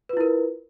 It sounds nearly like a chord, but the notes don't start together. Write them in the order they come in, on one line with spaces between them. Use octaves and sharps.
B4 F4 E4 A#4